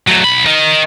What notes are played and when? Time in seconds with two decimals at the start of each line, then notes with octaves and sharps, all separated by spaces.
0.07 F#3 A3
0.24 B1 B5
0.46 A#4 D#5